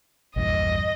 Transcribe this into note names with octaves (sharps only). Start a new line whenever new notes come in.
A#1 E2 G2 D#5